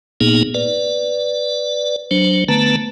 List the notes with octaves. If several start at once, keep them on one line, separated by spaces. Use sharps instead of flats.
A#2 A#3 B3 D#4 G#4
B4 D5
F#3 D4 C5
D3 A3 B3 B4 A5 A#5